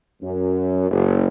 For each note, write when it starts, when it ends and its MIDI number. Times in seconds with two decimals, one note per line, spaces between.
0.23 0.90 42
0.91 1.26 30